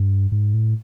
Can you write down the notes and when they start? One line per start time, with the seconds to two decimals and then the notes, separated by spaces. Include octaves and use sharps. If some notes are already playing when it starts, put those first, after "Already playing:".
Already playing: G2
0.32 G#2
0.54 A2